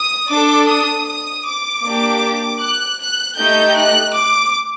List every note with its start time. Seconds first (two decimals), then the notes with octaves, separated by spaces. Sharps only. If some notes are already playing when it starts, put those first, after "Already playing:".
Already playing: D#6
0.29 D4 A4 D6
0.67 D#6
1.06 D#6
1.45 D6
1.83 A#3 D4 G4
2.60 F#6
2.99 F#6
3.37 A3 D#4 G4 G6
3.76 F#6
4.14 D6